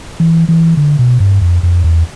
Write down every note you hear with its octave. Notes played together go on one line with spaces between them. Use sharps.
E3
E3
D3
B2
G2
F2
F2
E2